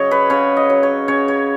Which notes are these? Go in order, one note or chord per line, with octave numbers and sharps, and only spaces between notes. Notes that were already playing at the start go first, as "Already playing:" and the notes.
Already playing: C#3 F#3 C#5 D#5
B4
C#3 C#5
D#5
F#3
C#5
C#3 C#5
C#5